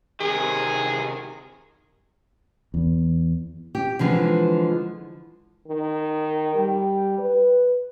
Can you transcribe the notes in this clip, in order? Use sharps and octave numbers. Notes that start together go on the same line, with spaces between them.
C3 D#3 G#4
E2
G4
D3 E3 F3 G#3
D#3
G3
B4